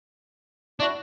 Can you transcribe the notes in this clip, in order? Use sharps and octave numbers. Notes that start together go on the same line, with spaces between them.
D4 E4 F#4